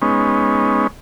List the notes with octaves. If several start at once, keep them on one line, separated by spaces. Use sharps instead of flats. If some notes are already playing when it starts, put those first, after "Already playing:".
G#3 B3 C#4 D#4